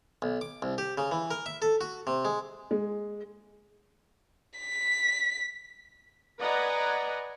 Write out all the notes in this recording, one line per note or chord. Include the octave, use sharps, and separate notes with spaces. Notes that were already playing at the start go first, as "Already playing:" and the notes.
B1
D6
C2
G4
C#3
E3
A#4
E5
A4
F#4
C3
G#3
G#3
B6
B4 D5 D#5 F#5 G#5 A#5